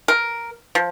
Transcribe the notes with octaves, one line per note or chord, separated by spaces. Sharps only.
A#4
F3